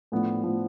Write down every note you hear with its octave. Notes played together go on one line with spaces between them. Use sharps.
A2 F3 B3 D4
A2 F3 B3 D4